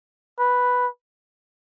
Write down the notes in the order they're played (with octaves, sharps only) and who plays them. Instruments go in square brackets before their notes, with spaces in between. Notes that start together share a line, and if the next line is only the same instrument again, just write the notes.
[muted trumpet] B4